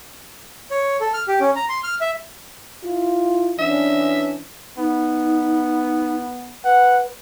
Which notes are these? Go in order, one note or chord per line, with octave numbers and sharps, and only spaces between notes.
C#5
A4
F6
G4
C#4
A#5
C6
F6
E5
E4 F4
E3 C#4 D4 E5
B3 D#4
B4 F#5